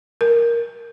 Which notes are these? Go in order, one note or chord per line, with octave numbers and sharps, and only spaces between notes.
A#4